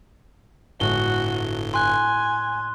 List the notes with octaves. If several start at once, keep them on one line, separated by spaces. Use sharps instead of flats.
G1 A2 G#3 F#4 G7
G#5 C6 F#6